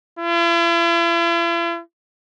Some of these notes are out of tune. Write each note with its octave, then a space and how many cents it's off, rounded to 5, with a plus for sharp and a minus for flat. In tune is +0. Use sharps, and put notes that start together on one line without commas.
E4 +45